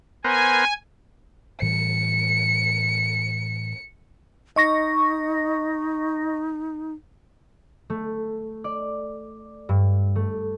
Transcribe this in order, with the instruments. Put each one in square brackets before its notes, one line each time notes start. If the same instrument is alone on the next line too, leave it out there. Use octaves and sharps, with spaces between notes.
[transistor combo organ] B3 A#4 C5 [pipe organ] G#5
[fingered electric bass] A2 E3 G3 [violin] C#7
[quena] D#4 [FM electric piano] D#5 C#6 A#6
[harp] A3
D5
G2
A3